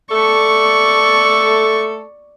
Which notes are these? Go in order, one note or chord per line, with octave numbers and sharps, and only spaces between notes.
A3 A4 D5 C#6